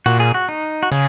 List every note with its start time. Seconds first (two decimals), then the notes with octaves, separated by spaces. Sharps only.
0.06 A#2 F#4
0.20 G#4
0.34 F#4
0.49 D#4
0.83 F#4
0.92 C#3 G#4